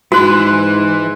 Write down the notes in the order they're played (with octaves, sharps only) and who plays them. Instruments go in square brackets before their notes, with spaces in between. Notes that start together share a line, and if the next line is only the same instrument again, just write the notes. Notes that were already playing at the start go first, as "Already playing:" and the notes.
[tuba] G#2 [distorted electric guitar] E3 B5 [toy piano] F#4 [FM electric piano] C6 F#6